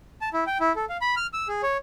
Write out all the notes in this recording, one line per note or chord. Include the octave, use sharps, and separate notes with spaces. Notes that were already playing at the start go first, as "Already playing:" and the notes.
A5
E4
G5
E4
A4
F5
B5
F6
E6
G#4
C#5